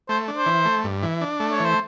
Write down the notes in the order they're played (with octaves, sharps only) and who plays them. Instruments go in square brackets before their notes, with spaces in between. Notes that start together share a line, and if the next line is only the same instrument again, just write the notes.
[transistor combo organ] A3 [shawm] C5
[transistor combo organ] D4
[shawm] C5
[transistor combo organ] E3
A3
G2
E3
D4
A3
[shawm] C#5
[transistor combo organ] E3
[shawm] C5